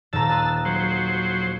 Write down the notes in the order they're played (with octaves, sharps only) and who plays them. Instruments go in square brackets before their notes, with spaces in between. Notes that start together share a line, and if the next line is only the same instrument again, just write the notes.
[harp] D#1 A4 A#5 [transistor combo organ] A5 E6
[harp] C6 D#6 F#6
[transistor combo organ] F#3 C5